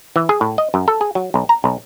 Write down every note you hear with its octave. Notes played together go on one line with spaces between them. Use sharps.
E3
G#4
A2
D#5
F#2
A4
G#4
F#3
B1
A#5
B1